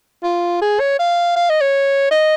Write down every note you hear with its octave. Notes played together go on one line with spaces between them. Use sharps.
F4
G#4
C#5
F5
F5
D#5
C#5
D#5